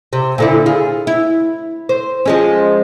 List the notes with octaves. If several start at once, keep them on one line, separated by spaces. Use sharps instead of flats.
C3
A#2 D3 E4
F4 G#4
E4
C5
F3 G#3 C#4